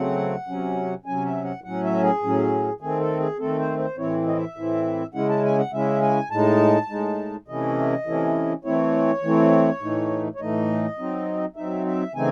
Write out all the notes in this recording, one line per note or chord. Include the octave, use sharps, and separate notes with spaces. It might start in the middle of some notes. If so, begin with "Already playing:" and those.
Already playing: C#3 F#3 A3 C4 F#5
C3 F#3 C#4
C3 F#3 C#4 G#5
E5
F#5
A2 F#3 C#4 F#5
E5
G#4
A2 F#3 C#4
D#3 A3 C4 G#4
A4
G#4
D#3 A3 C4 A4
C5
C5
A2 E3 C4 E4 C#5
D#5
E5
A2 E3 C4 E4
C#3 G#3 C#4 E4 F#5
A5
G#5
F#5
C#3 G#3 C#4 E4 E5
G#5
A2 G#3 D#4 A5
A2 G#3 D#4
C3 E3 A3 C#4 E4 D#5
C3 E3 A3 C#4 E4
E3 A3 C4 E4 C#5
E3 A3 C4 E4
A2 E3 A3 D#4
C#5
A2 E3 A3 D#4 D#5
F#3 C4 D#4
F#3 C4 D#4 E5
E5
C#3 E3 A3 C4 D#4 G#5